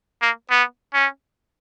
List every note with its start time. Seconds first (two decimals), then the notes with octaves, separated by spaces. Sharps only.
0.22 A#3
0.50 B3
0.94 C#4